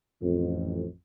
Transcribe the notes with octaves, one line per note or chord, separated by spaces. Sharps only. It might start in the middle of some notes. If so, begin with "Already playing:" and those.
A1 F2